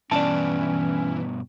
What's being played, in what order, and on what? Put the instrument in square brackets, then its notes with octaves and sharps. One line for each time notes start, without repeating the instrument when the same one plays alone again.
[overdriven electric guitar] G2 B2 [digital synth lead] E3 [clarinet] C#4 [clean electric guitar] D5 A5